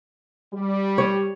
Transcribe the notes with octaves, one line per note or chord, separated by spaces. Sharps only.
G3
C#5